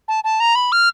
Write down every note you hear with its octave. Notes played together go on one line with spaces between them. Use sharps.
A5
A5
A#5
B5
F6